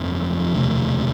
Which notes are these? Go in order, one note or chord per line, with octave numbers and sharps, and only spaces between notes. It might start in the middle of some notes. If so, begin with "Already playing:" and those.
Already playing: G1 F2 C3 F3
E1 D2 C3